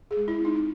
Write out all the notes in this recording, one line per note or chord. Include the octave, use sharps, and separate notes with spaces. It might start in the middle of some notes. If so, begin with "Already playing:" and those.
G#4
G#3
E4
C4
D#4